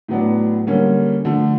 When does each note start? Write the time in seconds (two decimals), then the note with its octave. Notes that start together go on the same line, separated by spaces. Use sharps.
0.08 A2 F#3 B3 D4
0.67 D3 G3 A#3 C#4
1.25 D3 F3 A3